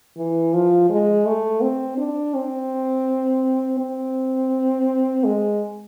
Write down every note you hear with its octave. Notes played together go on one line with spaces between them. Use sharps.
E3
F3
G#3
A3
C4
D4
C4
C4
G#3